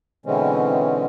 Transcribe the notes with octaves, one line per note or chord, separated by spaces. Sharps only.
B2 D3 E3 G#3 C4 C#4